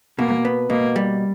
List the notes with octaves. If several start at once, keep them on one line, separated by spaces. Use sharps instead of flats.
B2 A#3
B3
B2 A#3
G3